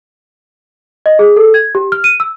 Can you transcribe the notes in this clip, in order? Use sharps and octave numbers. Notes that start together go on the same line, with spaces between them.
D#5
G#4
A4
G#6
G4
F6
D#7
E6